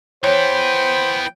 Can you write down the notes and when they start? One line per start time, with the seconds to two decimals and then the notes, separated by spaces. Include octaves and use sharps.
0.24 E3 B3 C5 C#5 G5